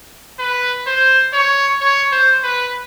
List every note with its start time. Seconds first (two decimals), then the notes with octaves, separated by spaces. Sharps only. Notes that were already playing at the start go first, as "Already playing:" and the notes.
0.39 B4
0.87 C5
1.33 C#5
1.81 C#5
2.12 C5
2.44 B4